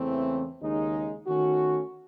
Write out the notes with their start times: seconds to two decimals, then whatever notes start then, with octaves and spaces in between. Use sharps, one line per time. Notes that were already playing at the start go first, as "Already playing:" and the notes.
Already playing: E2 C#3 E3 A3 C4
0.60 D#2 C#3 G#3 D#4
1.27 D#3 A3 C#4 F#4